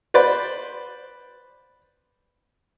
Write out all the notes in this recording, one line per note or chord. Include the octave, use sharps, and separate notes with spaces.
B4 C5 D5 B5